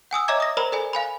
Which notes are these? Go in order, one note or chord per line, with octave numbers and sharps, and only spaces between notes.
F#5 G#5 D#6 E6
C#5 D#5 E5 A#5 D6 G#6
D#6 A#6
A#4 C5 D5 A#5 B5
A4 D5 G#5
F5 G#5 B5